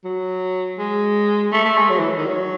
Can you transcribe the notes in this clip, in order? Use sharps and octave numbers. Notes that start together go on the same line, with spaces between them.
F#3
G#3
A3
A3
G#3
F#3
E3
D#3
F#3